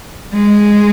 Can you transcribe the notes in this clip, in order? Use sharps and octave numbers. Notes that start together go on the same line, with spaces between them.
G#3